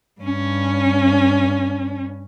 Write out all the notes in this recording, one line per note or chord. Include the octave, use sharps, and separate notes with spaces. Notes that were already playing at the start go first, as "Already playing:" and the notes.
G2 C#4